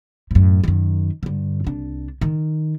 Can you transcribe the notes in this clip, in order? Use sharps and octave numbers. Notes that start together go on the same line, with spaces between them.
F#2 A2
F#2 D#3
G2 D3
C2 D4
D#3